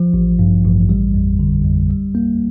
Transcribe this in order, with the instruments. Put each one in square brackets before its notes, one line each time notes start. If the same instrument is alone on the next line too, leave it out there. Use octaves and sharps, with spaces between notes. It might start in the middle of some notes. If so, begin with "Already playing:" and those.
Already playing: [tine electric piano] F3
A1
G2
A1
G3
F2
D3
F2
G3
A#3